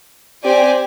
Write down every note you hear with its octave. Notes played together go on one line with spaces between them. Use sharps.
C4 G4 D5 G#5